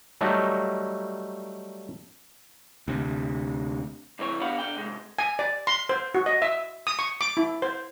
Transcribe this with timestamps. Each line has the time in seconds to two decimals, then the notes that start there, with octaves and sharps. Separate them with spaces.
0.21 F#3 G3 A3 D#4
2.88 D2 C3
4.19 C2 E3 C4 C#5
4.41 D3 B3 G4 F5 F#5 B5
4.59 D3 G5
4.76 G#2 C3 G#3
5.19 G#5
5.39 D5
5.67 C6
5.89 C5
6.15 F#4
6.26 D#5
6.42 E5
6.87 D#6
6.99 C#6
7.21 D6
7.37 E4
7.62 C5